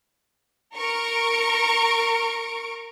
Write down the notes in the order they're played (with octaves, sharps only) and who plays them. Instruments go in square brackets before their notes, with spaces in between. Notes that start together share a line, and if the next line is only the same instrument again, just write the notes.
[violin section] A#4 C#6 D7